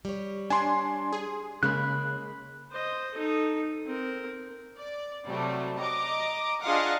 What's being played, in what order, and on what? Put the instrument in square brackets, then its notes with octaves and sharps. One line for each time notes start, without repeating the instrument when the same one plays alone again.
[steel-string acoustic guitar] G3 C#5
[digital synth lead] D4 [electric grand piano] G#5 C6
[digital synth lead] G#4
[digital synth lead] C#3 [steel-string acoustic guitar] G#3 A#3 [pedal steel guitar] B5 F#6
[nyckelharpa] C5 D#5
D#4 A4
C4 A#4
[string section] D5
C3 F#3 G3 A3
D#5 A#5 D6
D4 F4 G#4 D#5 F5 F#5